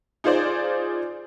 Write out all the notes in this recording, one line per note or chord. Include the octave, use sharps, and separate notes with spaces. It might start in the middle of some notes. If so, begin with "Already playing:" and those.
D#4 F4 G#4 C5 D5